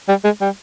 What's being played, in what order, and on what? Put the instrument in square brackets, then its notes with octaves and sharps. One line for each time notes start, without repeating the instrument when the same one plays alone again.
[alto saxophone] G3
G#3
G3